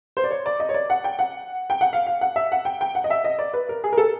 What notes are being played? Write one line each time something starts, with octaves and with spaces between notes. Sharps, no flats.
C5
D5
C#5
D5
D#5
C#5
D5
F#5
G5
F#5
G5
F#5
F5
F5
F#5
E5
F#5
G5
G5
F#5
D#5
E5
D#5
D5
B4
A#4
G#4
A#4
A4